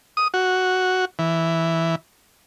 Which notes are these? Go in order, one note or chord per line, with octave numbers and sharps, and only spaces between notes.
D#6
F#4
E3